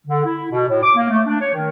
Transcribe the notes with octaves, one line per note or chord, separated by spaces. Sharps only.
D3
E4
B2
A2
D6
A#3
A3
D4
C#5
D#3